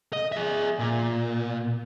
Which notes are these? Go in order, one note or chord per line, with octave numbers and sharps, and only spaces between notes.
D#5
G#4 E5
A#2